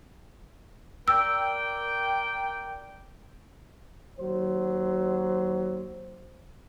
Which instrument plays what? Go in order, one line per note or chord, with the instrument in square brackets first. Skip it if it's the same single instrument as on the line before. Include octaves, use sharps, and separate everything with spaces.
[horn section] A#4 D5 G5 [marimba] E6
[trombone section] D#2 F#3 C5